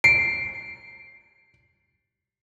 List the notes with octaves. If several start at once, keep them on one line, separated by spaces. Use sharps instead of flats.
C7 D7